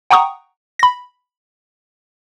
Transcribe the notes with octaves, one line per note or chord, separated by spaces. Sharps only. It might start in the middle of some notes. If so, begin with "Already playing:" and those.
F#5 G5 A#5 C#6 D#6
B5 A#6